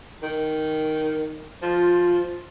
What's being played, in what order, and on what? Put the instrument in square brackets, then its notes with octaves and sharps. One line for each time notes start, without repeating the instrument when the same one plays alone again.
[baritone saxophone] D#3
[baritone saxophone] F3 [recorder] F4